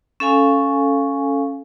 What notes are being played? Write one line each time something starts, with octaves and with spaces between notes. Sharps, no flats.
C#4 A4 F5 G#5